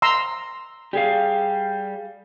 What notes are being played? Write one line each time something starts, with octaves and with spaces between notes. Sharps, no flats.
A#5 C6 E6
G3 G4 G#4 F5